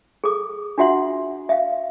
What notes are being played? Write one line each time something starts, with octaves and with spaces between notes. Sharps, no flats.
G#4 A4 D6
D4 F4 F#4 E5 F#5 C6
E5 F5